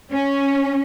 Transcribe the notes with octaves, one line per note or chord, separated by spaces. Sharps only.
C#4